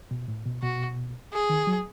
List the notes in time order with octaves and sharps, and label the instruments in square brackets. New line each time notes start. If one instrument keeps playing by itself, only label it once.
[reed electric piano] B2
A2
B2
[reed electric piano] B2 [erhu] F#4
[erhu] G#4
[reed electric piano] D#3
F#3